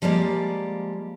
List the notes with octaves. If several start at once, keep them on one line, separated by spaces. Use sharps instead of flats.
F3 G3 G#3 A#3 D5